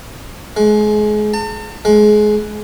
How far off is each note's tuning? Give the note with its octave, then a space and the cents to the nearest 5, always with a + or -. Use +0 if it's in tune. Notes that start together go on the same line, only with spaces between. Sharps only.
G#3 +30
A5 +40
G#3 +25